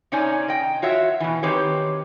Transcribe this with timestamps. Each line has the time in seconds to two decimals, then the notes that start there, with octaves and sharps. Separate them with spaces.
0.12 C3 C#4 D#4 C#5 D5 G#5
0.48 D#5 G5
0.82 F4 F#4 C#5 E5
1.20 B2 E3
1.43 D#3 C4 G4 B4 C#5